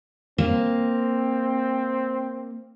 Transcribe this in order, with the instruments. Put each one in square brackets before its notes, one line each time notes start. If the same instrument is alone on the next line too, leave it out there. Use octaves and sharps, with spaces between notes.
[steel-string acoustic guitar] A#3 [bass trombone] C4